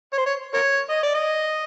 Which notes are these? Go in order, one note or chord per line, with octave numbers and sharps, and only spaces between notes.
C#5
C5
C#5
A#4 C#5
D#5
D5
D#5